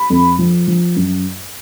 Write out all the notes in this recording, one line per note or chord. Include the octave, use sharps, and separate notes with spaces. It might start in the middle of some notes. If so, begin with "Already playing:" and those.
Already playing: B5
F2
F3
F3
F#2